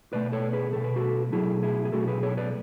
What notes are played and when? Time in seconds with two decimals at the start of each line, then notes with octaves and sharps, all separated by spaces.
0.13 B2 A3 B4 D5
0.32 A4 C#5
0.53 G#4 B4
0.73 B2 A3 A4
0.84 B4
0.96 F#4 A4
1.32 B2 F#3 A3 E4 G#4
1.63 E4 G#4
1.85 G#4
1.92 B2 F#3 A3 F#4 A4
2.07 G#4 B4
2.23 A4 C#5
2.37 B4 D5